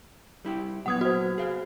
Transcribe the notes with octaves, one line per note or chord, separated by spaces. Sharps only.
G3 E4 G4
A#2 F#3 B3 F#5 D#6 G#6
F#4 C5
G#4 F5